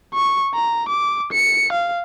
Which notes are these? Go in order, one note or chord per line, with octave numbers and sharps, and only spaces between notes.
C#6
A#5
D6
C#7
F5